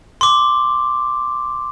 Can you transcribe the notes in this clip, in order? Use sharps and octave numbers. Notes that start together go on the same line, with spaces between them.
C6 D6